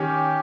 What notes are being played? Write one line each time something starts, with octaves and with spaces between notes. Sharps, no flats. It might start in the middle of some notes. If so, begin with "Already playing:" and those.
Already playing: D#3 C#4 G4